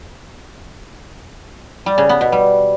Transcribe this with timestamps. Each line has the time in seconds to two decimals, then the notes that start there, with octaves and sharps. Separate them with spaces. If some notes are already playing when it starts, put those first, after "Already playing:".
1.86 G3
1.98 C#3
2.09 B3
2.21 B2
2.32 G3